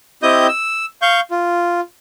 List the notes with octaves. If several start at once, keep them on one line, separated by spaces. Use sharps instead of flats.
C4 E4 G4 D#5 D#6 G6
E6
F5 C#6 G6
F4